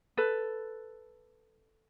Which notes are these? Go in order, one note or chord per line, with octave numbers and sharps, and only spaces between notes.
A4 B4